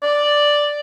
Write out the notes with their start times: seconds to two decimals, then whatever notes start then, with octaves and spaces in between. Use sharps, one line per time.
0.02 D5